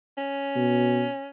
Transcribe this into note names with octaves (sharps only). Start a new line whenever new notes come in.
C#4
B2